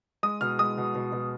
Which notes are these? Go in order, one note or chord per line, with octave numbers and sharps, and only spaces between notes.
G#3 D#6
B2 F6
G#3 D#6
B2
B2
B2